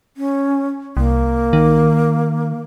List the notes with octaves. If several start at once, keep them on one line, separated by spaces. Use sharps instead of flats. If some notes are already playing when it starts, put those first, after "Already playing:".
C#4
C2 A#3
D#3